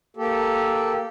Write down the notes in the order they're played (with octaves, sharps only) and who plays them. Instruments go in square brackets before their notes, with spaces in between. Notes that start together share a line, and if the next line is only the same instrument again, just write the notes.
[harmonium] A#3 G4 A4